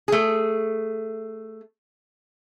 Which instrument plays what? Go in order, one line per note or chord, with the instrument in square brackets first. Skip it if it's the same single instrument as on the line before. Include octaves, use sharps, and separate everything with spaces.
[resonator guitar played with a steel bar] A3 G#4